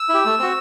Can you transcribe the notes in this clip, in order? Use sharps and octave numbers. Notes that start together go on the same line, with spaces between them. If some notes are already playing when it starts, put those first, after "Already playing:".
Already playing: E6
E4 G4
A3
C4 F#4